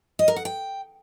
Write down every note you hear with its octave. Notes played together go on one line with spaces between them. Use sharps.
D#5
A#4
F#5
G5